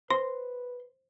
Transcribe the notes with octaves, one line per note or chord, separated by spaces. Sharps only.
B4 C5 C6